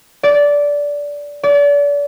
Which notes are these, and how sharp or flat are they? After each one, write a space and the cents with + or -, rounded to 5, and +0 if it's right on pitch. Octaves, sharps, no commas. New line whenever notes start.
D5 -15
D5 -35